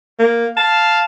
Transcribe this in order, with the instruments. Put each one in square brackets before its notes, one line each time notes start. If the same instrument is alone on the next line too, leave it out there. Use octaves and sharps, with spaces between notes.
[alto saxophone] A#3
[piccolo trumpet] F5 [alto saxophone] A5